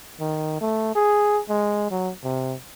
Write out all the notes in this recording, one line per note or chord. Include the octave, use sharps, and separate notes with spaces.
D#3
A3
G#4
G#3
F#3
C3